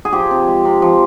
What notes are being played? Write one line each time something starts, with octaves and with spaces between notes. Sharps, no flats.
G#4
F3 G4
C3
G#3
C3
F3